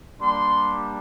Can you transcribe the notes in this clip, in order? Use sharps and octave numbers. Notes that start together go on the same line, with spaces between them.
G3 A#3 D4 G4 C6